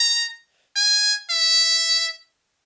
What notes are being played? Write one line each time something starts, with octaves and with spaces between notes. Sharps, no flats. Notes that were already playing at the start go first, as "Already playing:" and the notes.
Already playing: A#5
G#5
E5